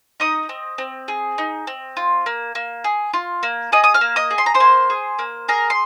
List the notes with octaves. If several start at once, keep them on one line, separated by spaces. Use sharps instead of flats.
D#4 D#5 D#6
C4
C4
G#4
D#4
C4
F4
A#3
A#3
G#4
F4
A#3
G#4 D#5 D#6
D#6
F5 F6
A#3
D#5 D#6
G#4
C6
A#5
C5 C6
A#3
G#4
A#3
G#4 A#4 A#5
C6